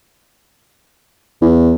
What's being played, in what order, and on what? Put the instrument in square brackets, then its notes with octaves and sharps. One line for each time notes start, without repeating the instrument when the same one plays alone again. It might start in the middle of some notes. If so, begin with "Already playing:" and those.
[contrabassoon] E2